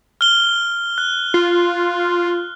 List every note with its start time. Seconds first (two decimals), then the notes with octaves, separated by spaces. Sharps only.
0.21 F6 G7
0.98 F#6
1.34 F4